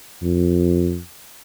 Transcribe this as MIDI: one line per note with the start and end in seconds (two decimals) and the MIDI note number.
0.23 1.00 41